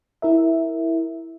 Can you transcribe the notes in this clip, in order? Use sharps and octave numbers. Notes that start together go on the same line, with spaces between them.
E4 A#4 E5